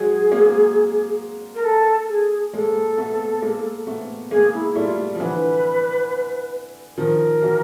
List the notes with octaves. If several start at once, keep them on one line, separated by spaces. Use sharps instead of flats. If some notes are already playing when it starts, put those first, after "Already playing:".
Already playing: F#3 G#3 G#4
G#3 A#3
A#4
A4
G#4
G#3 A#3 A4
A3 B3
G#3 A#3
A3 B3
G#3 A#3 G#4
E4
G3 A3 F4
F3
D3 E3 B4
D#3 F3 A#4
E3 F#3